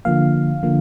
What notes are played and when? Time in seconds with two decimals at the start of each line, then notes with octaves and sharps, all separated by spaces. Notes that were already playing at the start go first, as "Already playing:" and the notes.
0.05 D3 F3 A#3 F5
0.63 D3 F3 A#3